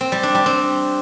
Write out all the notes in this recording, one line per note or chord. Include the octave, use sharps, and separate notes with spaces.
C4
G3
D4
G3
C4